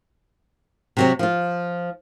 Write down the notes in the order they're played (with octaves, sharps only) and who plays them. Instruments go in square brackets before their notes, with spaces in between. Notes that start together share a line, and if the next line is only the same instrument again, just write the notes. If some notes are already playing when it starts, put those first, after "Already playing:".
[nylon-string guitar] C3 F#3 C4
F3 F4